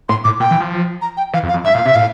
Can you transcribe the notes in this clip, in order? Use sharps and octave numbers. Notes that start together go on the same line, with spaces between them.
A2 C6
A2 D6
A#2 G5
E3
F3
A#5
G5
E3 F5
F2
F5
F2
G2 E5
A#2 F5
C3 E5
A2 F5